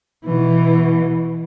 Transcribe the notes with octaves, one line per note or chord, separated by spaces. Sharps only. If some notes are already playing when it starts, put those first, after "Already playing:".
B2 E3